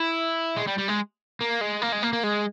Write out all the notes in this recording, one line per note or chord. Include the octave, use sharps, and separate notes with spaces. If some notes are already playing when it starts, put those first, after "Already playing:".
Already playing: E4
G#3
G3
G3
G#3
A#3
G#3
A#3
G#3
A#3
A#3
G#3